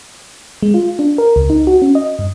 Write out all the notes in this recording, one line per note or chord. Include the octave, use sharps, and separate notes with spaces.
G#3
F4
D4
A#4
C#2
D#4
F#4
C#4
D#5
G2